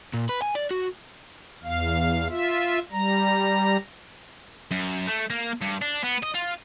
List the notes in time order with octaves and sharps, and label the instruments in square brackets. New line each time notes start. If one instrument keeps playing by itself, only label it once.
[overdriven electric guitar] A#2
B4
G#5
D5
F#4
[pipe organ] E2 F5
F4 E5
G3 A#5
[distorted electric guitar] F#2
A3
A#3
G2
D4
B3
D#5
F4